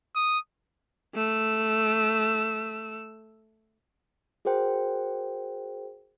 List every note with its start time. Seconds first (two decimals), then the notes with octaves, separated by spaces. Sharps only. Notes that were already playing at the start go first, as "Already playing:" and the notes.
0.15 D#6
1.14 A3 E6
4.45 F#4 G#4 A#4 C5 G5